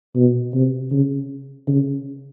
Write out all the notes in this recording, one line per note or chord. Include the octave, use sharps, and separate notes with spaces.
B2
C3
C#3
C#3